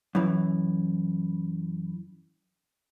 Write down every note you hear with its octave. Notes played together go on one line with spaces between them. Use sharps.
F#2 E3